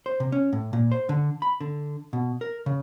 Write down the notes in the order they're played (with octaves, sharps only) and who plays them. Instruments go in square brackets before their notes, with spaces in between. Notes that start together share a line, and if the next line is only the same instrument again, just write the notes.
[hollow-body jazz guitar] C5
C3
C#4
A2
A#2
C5
D3
B5
D3
B2
A#4
C#3